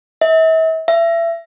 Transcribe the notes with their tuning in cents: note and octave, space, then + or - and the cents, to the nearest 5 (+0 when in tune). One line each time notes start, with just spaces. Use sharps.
E5 -40
E5 +30